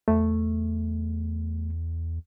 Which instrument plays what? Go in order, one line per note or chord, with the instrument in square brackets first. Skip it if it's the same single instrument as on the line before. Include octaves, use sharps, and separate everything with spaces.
[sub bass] E2 [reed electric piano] A3